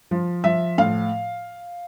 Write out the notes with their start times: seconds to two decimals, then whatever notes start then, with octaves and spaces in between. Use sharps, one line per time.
0.11 F3
0.44 F3 E5
0.78 A2 F5